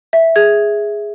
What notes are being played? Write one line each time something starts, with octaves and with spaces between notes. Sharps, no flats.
E5
G#4 G#6